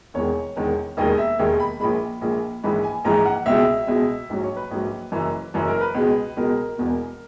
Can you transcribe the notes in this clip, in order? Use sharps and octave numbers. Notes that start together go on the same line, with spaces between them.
E1 E2 D#3 G#3 C#5
E1 E2 D#3 G#3
E1 D#2 D#3 G#3 D#5
E5
E1 D#2 D#3 G#3
B5
A#1 A#2 G#3 B5
A#1 A#2 G#3
A#1 G#2 E3 G#3 B5
G#5
A#1 G#2 E3 G#3 A#5
F#5
C#2 B2 G#3 E5
C#2 B2 G#3
A#1 G#2 F#3
C#5
B4
A#1 G#2 F#3
F#1 F#2 E3
F#1 F#2 E3
A#4
B4
C#2 B2 G#3
C#2 B2 G#3 A#4
E1 E2 B2